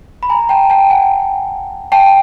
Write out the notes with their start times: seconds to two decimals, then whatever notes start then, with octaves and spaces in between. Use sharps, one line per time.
0.23 B5
0.30 G#5 A#5
0.49 G5 A5
0.70 G5 A5
0.90 F#5 G#5
1.92 G5 A5